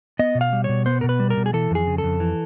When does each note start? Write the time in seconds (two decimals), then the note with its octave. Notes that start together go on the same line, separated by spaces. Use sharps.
0.19 B3 D#5
0.35 B2
0.41 F5
0.53 G3
0.64 B2 C#5
0.86 B3 C5
1.01 B2 A#4
1.09 B4
1.20 G3
1.30 A#4
1.37 B2
1.46 G#4
1.53 E3 A4
1.71 F2 G#4
1.87 C#3
1.98 A4
2.04 F2
2.20 E3